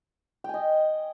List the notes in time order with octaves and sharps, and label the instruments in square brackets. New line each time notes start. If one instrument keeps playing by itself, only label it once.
[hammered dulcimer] G5
G#5
D#5